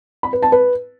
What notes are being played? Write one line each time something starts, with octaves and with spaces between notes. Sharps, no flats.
B5
B4
A5
B4